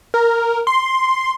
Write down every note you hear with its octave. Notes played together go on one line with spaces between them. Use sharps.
A#4
C6